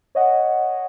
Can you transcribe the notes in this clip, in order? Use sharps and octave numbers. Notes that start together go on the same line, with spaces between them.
C#5 D#5 F#5